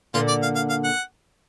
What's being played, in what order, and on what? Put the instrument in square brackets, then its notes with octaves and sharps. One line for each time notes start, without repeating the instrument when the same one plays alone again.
[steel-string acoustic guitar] A#2 D3 [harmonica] F4
[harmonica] D5
F5
F5
F5
F#5